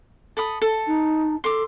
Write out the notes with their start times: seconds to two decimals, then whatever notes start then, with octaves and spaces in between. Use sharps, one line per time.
0.37 A4 B5 D#6
0.62 A4
0.86 D#4
1.44 A4 C6 D6